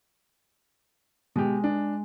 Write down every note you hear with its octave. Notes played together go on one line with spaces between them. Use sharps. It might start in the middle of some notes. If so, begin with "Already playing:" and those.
B2 G#3 G4
D4